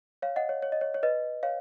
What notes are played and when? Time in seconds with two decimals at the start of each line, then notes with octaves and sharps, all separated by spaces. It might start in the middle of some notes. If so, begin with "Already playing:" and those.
0.22 C#5 F5
0.36 D#5 F#5
0.49 C#5
0.62 C#5
0.72 D#5
0.81 C#5
0.94 C#5
1.03 B4 D#5
1.43 C#5 F5